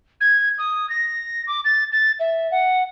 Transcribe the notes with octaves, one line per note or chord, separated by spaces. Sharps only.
G#6
D#6
A#6
D6
A6
A6
E5
F#5